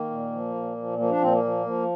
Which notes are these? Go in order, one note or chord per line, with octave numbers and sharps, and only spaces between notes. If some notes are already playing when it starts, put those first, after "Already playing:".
Already playing: D#3 A#3
A#2
F3
A#2
F3
F3 A#3
D4
A#2 C4
A#3
F3
F3